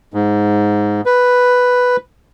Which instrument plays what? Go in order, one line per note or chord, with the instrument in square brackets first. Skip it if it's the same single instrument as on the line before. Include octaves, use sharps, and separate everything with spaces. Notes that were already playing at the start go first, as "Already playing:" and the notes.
[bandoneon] G#2
B4